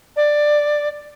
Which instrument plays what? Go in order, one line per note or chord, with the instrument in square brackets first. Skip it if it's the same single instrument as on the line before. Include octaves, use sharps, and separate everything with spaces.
[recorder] D5